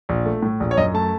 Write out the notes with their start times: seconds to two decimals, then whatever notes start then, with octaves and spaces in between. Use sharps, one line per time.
0.09 A#1
0.26 A3
0.43 A2
0.60 A#1
0.71 C#5
0.77 F#2 D#5
0.94 A3 A5